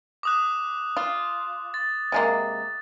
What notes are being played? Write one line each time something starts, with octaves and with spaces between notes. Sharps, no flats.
D6 D#6 F#6
F4
A6
C3 G#3 A#3